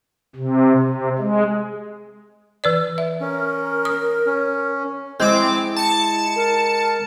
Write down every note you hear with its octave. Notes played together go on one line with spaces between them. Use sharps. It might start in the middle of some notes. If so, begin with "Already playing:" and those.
C3
C3
G#3
E3 B4 D5
E5
C#4 A#4
D#6
C#4
G#3 C4 E4 D6
A5 C#7
A#4